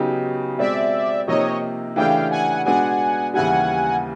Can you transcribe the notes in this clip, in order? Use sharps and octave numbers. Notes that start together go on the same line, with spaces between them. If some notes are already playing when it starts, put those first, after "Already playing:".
Already playing: C#3 F#3 B3 D#4 G4
B2 G#3 C4 D5 E5
C3 F3 A#3 D#4 G4 C#5 D#5
C#3 E3 A3 D4 G4 F5 G5
F#5 G#5
B2 G#3 B3 D4 F#5 G#5
D#2 C#3 E3 G3 F#5 G#5